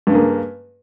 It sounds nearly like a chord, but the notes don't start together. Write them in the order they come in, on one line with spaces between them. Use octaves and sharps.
G2 C#3 A#3